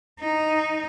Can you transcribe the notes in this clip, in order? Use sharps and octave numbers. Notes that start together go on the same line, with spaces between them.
D#4